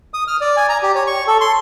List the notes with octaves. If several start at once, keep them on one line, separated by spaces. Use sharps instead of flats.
D#6
F6
D5
G#5
A#5
G4
C#5
C#6
A4
C6